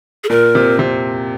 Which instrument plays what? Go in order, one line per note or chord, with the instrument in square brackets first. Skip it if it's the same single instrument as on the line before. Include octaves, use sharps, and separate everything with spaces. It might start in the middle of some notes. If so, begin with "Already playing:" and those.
[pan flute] G#4
[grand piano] A#2 [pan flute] A#4
[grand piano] C3
C3